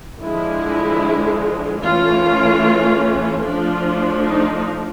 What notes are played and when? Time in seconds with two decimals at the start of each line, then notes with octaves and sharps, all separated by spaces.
0.22 D3 F3 G#3 E4
1.83 E3 A3 C#4 F4
3.44 F3 A3 D4 F4
4.24 D#4